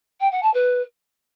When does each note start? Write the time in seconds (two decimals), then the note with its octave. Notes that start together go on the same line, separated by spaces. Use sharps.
0.20 G5
0.31 F#5
0.42 A5
0.54 B4